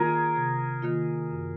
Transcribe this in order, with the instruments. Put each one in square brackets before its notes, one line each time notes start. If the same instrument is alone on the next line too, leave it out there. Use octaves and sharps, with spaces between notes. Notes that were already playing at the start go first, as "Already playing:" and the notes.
Already playing: [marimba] D#3 A#3 F4 [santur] G#4 A#4
[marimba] C3
D#3 A#3 F4
F#2